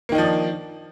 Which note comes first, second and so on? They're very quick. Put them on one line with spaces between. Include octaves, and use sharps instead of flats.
A#3 D#3 D#4 F3 D4